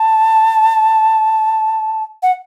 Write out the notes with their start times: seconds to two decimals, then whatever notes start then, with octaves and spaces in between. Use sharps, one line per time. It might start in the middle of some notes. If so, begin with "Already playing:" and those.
Already playing: A5
2.23 F#5